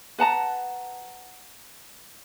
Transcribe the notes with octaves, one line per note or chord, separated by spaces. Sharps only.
B4 F#5 A5 A#5